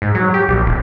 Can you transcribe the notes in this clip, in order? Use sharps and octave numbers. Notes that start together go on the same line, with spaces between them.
G#2
F#3
G4
A#1
D1